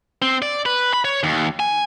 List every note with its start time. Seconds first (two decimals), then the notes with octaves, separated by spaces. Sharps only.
0.22 C4
0.42 D5
0.66 B4
0.94 B5
1.05 C#5
1.23 D#2
1.60 G#5